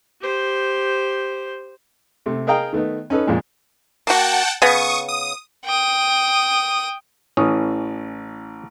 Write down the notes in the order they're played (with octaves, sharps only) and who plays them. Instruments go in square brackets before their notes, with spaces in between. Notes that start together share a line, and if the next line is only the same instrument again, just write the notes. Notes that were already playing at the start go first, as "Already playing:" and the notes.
[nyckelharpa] G4 C5
[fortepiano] C3 A3
G#4 A#4 D#5 F5 G5 A#5
D#3 A3 B3 D#4
C#4 D#4 A4 B4
F2 A#2 F3 G#3
[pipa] A#3 F#4 [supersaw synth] F#5 G5 A5
[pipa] C#3 B3 [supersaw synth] C#6 D#6
[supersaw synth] D#6
[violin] G5 D#6
[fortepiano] A1 E3 D#6 [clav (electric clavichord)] C#4